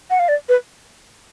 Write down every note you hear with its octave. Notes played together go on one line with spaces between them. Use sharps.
F#5
F5
D5
B4